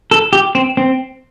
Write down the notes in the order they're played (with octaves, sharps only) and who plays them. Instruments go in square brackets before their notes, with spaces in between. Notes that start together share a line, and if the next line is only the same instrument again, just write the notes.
[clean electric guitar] A4
G4
C4
C4